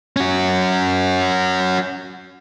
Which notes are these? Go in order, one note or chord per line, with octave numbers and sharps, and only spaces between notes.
C#4 F#4